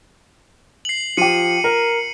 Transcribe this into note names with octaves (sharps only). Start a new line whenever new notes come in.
C7 F#7
F3 G4 C#7 D#7
A#4